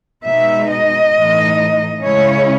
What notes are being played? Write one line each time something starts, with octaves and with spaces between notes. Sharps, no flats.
B2 G#3 D#4 E5
D#5
A2 E3 A3 D#4
C#3 G#3 C#4 E4 C#5